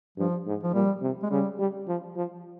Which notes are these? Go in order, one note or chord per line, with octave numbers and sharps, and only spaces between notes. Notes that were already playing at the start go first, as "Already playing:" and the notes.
G2 F3
G#2
F3
A#2 G3
C3
G#3
C#3 G3
G3
F3
F3